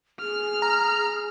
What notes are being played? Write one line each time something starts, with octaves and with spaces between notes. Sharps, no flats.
G#4 F6
A#5